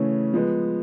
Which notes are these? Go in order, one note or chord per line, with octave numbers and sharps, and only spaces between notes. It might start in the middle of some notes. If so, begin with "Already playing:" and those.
Already playing: C#3 E3 A3 C#4
F3 G#3 B3